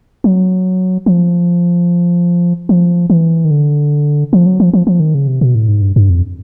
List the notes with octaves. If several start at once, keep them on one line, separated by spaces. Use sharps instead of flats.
F#3
F3
F3
E3
D#3
D3
F3
F#3
F3
F3
F3
D#3
C#3
C3
B2
A2
G#2
G2
G2
F2